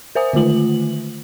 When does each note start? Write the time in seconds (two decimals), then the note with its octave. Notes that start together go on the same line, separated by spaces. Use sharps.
0.15 A#4 C5 E5 G#5 D#6
0.33 D3 D#3 A3 F4 F#7